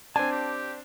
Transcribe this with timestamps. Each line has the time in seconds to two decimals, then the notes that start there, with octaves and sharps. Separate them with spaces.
0.16 C4 D4 G#5 A5
0.32 G4